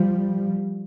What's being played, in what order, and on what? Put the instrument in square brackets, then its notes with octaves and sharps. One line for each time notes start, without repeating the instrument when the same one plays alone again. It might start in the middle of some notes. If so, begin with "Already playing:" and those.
Already playing: [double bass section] F3 G3